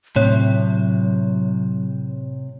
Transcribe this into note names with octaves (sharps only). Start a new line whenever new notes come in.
A2 C3 F#3 C#5